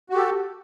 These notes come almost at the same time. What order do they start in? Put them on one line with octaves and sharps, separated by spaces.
F#4 G4 A4